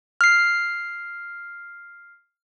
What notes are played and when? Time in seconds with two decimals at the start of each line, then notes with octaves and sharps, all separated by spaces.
0.21 F6 C7